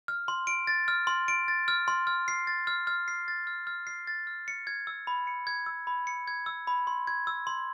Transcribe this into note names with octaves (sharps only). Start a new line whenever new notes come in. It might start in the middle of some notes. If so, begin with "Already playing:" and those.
F6
C6
D7
A6
F6
C6
D7
A6
F6
C6
F6
C7
A6
F6
F6
C7
A6
F6
F6
C7
A6
F6
C#7
G#6
E6
B5
C#7
G#6
E6
B5
C#7
G#6
E6
B5
C6
G#6
E6
C6